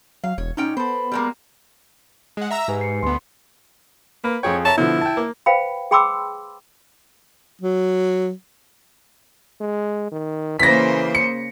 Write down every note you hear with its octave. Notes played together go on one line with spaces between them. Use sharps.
F#3 F5
E1 C#5
A#2 C#4 D#4 G5
B3 A4 C5 B5
G3 G#3 A#3
G#3 F#5
E5 A#5 E6
G#2 G4 B4 G#5
C7 C#7
D2 B3 C6
A#3 B4
F2 G#4 C#5 G5
C#5 E5 A5 A#5
B2 D3 F3 E4
G5 A5
A#3
B4 C5 F5 G5 B5
G#4 G5 B5 C6 D6 E6
F#3
G#3
D#3
C#3 E3 A#3 C5 A#6 B6
C#7